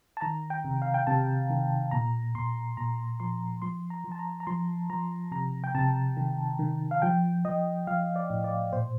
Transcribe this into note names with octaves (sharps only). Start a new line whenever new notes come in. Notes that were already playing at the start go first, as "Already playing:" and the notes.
A5
D#3 A#5
G5
C3
F5
G5
C3 A5
D#3
A#2 A#5
A#2 C6
A#2 A#5
F3 C6
F3 C6
A#5
F3
A5
A#5
A#5
F3 C6
F3 A#5
C3 A#5
G5
C3 A5
D#3
D#3
F5
F3 G5
F3 D#5
F3 F5
D5
A2
D5
A#2 C5